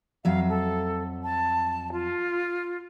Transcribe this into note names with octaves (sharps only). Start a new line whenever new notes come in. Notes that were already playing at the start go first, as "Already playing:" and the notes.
F2 F#3 E5 F5
A4
A5
F4